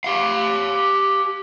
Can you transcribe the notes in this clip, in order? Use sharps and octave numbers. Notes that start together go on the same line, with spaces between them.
G4 F5